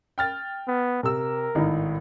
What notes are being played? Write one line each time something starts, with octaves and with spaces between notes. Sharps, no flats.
G5 F6 A6
B3
C3 A#4 E6
G#1 A2 D#4